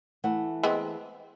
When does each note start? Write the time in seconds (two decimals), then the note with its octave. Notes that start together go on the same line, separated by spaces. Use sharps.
0.24 E3 A3 F#5
0.63 G#3 B3 C4